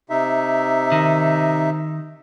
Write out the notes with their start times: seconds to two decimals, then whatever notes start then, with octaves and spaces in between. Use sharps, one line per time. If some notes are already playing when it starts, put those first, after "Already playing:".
0.10 C3 D#4 E5
0.92 D#3